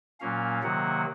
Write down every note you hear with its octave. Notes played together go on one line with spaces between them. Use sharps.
A#2 F#3 A#3 C#4 F5
C3 D#3 F#3 A#3 F#5